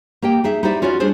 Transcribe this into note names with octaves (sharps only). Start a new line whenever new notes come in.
A#3 G4 D#5 G5
D#4 G#4 E5
D#4 E4 G4 C5 D5 E5
C#4 F4 F#4 C#5 D5
G3 D4 G#4 C5